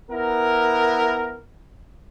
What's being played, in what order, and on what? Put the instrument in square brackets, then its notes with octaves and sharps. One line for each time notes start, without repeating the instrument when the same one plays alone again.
[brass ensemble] B3 E4 A#4